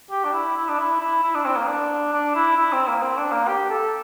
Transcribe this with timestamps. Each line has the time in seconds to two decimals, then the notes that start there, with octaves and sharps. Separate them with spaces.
0.11 G4
0.24 D4
0.33 E4
0.56 E4
0.69 D4
0.78 E4
1.00 E4
1.23 E4
1.34 D4
1.45 C4
1.56 A#3
1.67 D4
2.12 D4
2.35 E4
2.57 E4
2.72 C4
2.88 A#3
3.02 C4
3.18 D4
3.32 A#3
3.47 G4
3.69 A4